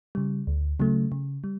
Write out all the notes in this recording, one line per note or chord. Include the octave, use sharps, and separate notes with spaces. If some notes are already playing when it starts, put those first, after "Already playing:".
C#3 G3
D2
C#3 F#3 A3
C#3
G3